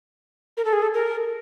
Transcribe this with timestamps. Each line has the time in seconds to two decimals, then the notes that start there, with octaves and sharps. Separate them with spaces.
0.57 A#4
0.65 A4
0.73 G#4
0.82 A4
0.94 A#4